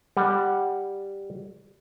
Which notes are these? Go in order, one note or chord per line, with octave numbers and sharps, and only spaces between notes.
G3 F#5